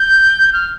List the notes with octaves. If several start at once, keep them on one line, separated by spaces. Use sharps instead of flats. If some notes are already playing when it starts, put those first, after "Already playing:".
Already playing: G6
F6